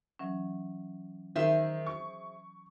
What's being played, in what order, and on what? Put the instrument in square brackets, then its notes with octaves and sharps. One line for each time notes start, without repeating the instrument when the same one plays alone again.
[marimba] E3 F#3 C#4
[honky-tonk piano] D#3 [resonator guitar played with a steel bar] G#4 C5 E5
[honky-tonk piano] C#6